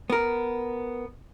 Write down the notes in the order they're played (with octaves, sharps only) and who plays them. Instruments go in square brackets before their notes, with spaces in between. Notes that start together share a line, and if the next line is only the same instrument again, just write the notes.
[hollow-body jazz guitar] B3 A#4